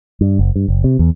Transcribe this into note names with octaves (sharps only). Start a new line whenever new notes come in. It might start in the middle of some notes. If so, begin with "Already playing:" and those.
G2
F#1
G2
F#1
C3
E2